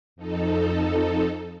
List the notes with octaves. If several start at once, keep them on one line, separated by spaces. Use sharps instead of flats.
F2 D#4 A4